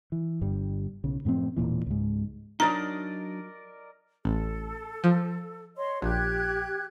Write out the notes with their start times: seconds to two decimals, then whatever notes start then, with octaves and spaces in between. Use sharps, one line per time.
0.12 E3
0.41 G1 G2 G3
1.04 B1 C#3
1.25 F#2 A2 F3 C4
1.56 E1 C2 A#2 E3
1.86 C#2 G#2
2.60 F#3 D4 D#4 A#4 D5 D#5 A#5
4.25 A1 A4
5.04 F3
5.77 C#5 D#5 C6
6.02 A#1 G4 F#6 G#6